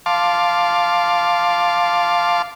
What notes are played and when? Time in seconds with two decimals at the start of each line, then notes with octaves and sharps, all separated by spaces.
0.06 F5 A5 C6 D6